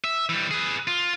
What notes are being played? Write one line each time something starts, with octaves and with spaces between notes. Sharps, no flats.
E5
E3 G3
G#4 B4
F4